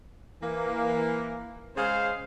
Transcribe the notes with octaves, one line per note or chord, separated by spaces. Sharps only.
E3 A#3
C#3 G#3 G#4 C5 F5